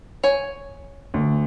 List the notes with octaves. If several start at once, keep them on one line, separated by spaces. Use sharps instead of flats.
C#5 G#5
D2